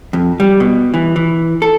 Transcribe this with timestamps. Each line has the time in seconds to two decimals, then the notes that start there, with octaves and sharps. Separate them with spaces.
0.13 F2
0.40 G3
0.60 B2
0.94 E3
1.16 E3
1.62 A4